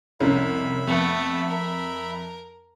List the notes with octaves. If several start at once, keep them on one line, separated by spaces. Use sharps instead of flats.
F1 C2 C#4 E5 B5
F2 A3 B3
A#4